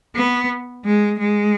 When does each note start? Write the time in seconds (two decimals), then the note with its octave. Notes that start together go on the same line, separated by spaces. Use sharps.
0.15 B3
0.85 G#3
1.19 G#3